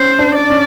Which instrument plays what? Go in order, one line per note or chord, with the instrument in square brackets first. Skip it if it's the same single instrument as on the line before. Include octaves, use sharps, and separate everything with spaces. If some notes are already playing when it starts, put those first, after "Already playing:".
Already playing: [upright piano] C#4 [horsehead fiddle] C5
[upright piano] D4
[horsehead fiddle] D5
[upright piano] C#4